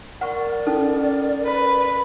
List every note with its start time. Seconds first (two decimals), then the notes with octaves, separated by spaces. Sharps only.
0.21 A#4 D5 F#5 C#6
0.67 C#4 D#4 A4
1.45 B4